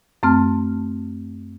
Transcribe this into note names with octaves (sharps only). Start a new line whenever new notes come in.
F#2 A3 C4 A5 F6